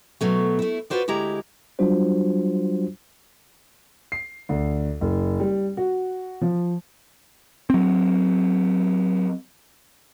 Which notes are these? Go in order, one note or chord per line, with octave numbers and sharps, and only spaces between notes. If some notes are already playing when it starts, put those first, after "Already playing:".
B2 F#3 A3
A3 E4
F4 F#4 B4 C5 D5
D2 G#3 E4 G4 A#5
F#3 G3 D4 F4 F#4 C5
C7
D2
F#1
G3
F#4
F3
F#3 C4